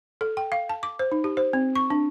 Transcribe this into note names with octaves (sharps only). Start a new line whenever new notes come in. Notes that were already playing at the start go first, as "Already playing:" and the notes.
A4
G5
F5
A5
D6
C5
D#4
G4
C5
C4
C#6
D4